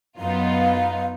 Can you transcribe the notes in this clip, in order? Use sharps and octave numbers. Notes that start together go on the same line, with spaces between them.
F#2 B3 D#4 F4 F5